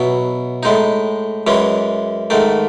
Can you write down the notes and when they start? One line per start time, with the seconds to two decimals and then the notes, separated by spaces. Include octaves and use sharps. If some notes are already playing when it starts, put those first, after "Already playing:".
Already playing: B2 F#3 B3 E4
0.63 A2 G#3 D#4
1.47 F#2 E3 G#3 C#4
2.30 G#2 D#3 A3